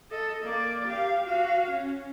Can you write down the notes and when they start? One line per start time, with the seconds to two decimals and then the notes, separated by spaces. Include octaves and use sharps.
0.11 A4 D#5
0.43 A#3 D5
0.87 G4 F5
1.24 F#4 F5
1.70 C#4